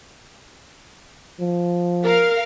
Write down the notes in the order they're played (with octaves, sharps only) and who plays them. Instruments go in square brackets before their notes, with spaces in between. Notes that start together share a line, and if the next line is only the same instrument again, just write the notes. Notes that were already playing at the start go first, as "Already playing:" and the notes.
[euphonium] F3
[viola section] A#4 F5